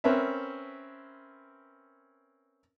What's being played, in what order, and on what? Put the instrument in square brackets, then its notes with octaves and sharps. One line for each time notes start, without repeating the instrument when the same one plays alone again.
[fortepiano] C4 C#4 A#4 B4 E5